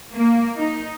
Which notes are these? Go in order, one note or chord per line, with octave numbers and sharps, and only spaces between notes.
A#3
D#4